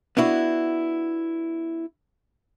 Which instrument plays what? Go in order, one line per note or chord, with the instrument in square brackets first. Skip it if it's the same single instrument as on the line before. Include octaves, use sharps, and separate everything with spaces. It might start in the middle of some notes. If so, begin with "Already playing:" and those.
[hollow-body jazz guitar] B3 D4 E4 F#4